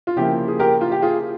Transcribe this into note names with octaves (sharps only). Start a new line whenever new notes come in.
F4
C#3 F3 A#3 E4 G4
G#4
G4 A#4
F4
G4
F4 G#4